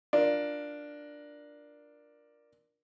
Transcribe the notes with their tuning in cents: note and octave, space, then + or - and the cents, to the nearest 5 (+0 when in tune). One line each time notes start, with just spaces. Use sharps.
D4 +5 F4 +0 A#4 +10